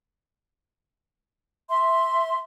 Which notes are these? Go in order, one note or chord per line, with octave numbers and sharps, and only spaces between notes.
E5 C6